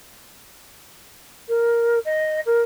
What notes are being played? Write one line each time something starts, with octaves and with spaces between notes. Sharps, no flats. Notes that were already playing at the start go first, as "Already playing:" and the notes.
A#4
D#5
A#4